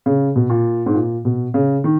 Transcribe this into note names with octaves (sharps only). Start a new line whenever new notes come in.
C#3
B2
A#2
G#2
A#2
B2
C#3
D#3